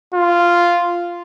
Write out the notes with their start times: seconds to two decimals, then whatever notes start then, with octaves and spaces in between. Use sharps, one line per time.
0.14 F4